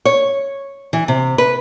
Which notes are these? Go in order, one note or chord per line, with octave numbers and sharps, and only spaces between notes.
C#5
E3
C3
B4